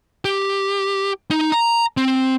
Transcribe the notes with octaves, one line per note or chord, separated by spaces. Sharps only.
G4
D#4
A#5
C4